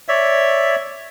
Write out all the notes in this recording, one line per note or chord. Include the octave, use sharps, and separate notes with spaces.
C#5 D5 E5